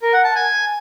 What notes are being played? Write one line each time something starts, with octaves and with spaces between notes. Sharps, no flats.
A#4
F#5
A5
G#5